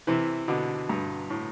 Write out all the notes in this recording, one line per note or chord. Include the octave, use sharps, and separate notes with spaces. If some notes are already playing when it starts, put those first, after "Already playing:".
C3 E3
B2 D3
G2
A2